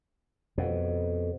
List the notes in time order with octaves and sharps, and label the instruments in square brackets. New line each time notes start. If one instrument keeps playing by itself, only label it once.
[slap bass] F2 B2